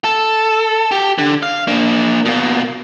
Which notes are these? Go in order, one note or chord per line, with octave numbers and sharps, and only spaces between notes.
A4
G4
D3
F5
A#3 D4
B2 A#3